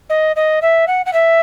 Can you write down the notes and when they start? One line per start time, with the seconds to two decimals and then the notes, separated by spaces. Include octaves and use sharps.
0.10 D#5
0.36 D#5
0.62 E5
0.87 F#5
1.06 F#5
1.13 E5